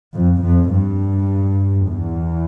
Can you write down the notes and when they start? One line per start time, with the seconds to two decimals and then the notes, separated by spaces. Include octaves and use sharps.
0.15 F2
0.43 F2
0.73 G2
1.90 E2